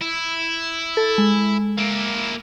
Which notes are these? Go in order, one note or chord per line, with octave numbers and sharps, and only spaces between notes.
E4
A4
G#3
A#3 E4